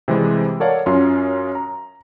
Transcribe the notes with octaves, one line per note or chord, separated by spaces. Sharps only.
C3 E3 G3 G#3
A4 A#4 C#5 D5 F5 F#5
F#2 C#4 F4 C6
A#5